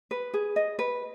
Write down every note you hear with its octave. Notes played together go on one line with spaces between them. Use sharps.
B4
G#4
D#5
B4